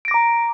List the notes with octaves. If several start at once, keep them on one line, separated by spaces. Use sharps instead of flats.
A#5 D6 A#6 D7